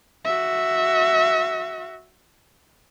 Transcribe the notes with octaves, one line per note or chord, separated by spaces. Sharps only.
F#4 E5